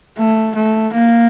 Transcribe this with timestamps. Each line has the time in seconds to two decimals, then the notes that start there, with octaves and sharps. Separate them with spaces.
0.18 A3
0.56 A3
0.94 A#3